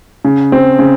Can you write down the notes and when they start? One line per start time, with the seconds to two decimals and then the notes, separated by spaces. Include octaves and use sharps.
0.25 C#3
0.52 C4
0.79 C#3